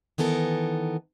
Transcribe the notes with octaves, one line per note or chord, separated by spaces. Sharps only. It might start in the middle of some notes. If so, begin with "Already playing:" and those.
D#3 E3 B3 A4 A#4